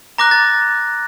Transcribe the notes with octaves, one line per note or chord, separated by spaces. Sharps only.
A#5 D6 F#6 A#6
A6